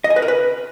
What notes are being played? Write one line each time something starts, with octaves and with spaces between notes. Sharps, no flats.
D#5
G#5
B4
A#4
B4